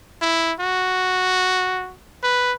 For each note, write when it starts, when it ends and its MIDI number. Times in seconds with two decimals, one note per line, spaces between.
0.21 0.53 64
0.60 1.94 66
2.23 2.53 71